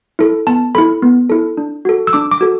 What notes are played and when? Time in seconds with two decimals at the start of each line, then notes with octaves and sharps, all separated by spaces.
0.19 E4 A4
0.47 B3 A5
0.75 E4 A4 B5
1.02 B3
1.30 E4 A4
1.57 D4
1.85 F#4 A4
2.07 E6
2.13 D4 D6
2.31 D6
2.41 F#4 A4